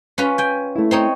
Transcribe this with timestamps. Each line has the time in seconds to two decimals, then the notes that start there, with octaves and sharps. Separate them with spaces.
0.18 C#4 F4 B4
0.38 G5 G#5
0.76 A3 E4
0.91 C4 D#4 C#5